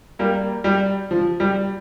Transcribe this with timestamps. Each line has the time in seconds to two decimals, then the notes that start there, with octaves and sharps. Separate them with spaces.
0.19 G3 A#3
0.64 G3
1.11 F3
1.40 G3